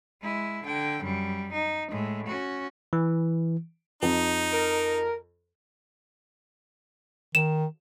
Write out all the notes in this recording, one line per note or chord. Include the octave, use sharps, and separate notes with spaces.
G#3 E4
D3 G5
F#2 G3
D#4
A2 G#3
C#4 F#4
E3
F2 D#4
A#4
D#3 E7